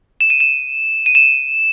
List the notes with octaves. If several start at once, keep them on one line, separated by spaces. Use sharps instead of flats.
E7
D#7
E7
D#7
E7